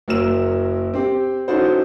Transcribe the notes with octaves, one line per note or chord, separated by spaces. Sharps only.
F#1 F#3 A#4 E6 E7
C4 G4
C#4 D#4 E4 F#4 A4 C5